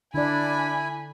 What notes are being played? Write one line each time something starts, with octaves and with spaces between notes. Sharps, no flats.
D3 D4 E4 D5 G#5 B5